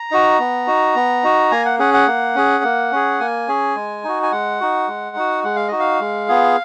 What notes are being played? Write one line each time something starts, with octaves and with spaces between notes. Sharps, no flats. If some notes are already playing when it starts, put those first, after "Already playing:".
Already playing: A#5
D#4 F#4
B3
D#4 F#4
B3
D#4 F#4
A#3 G#5
F#5
C#4 G#4 F#5
F#5
A#3
C#4 G#4
A#3
C#4 G#4
A#3 G#5
C#4 G#4
G#3
D#4 F#4
G#5
G#3 F#5
D#4 F#4
G#3
D#4 F#4
G#3 F#5
F5
D#4 F#4 D#5
F5
G#3
B3 F4 G#4